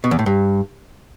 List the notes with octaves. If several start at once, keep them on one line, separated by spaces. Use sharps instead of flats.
B2
E2
A2
G2